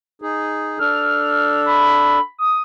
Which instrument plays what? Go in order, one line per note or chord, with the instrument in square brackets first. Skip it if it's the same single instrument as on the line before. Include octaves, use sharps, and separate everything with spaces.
[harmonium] D#4 G#4
[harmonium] D4 A4 [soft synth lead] F6
[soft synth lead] B5
D#6